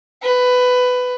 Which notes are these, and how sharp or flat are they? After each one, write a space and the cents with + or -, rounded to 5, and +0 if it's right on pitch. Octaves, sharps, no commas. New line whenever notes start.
B4 +15